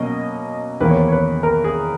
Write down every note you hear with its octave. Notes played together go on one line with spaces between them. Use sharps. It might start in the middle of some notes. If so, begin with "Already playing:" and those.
Already playing: B2 F#3 A#3 C#4 D#5
E2 D#3 A#3 B4
C#5
B4
C#5
B4
A#4
G#4